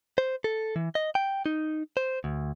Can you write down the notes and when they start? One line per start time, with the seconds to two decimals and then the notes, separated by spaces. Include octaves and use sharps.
0.18 C5
0.44 A4
0.76 E3
0.95 D#5
1.15 G5
1.46 D#4
1.97 C5
2.24 D2